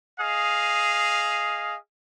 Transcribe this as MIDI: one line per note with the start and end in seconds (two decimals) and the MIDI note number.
0.20 1.77 68
0.20 1.77 75
0.20 1.77 77